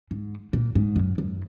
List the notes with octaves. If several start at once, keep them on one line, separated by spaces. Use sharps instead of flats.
G#2
A#2
G#2
F#2
F#2